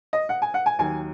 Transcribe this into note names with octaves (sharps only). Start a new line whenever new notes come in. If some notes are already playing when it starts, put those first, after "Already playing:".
D#5
F#5
G#5
F#5
G#5
D#2 D#3 F#3 G#5